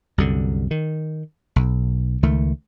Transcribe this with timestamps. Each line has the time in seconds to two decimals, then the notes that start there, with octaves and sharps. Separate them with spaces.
0.18 C2 F#2 D3
0.71 D#3
1.56 B1
2.23 C#2 D#3 A3